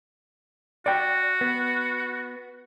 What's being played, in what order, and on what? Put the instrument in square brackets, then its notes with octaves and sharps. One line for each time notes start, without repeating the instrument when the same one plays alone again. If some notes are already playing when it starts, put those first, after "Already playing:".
[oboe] F#4 [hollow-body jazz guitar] D5 G5
[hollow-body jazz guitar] B3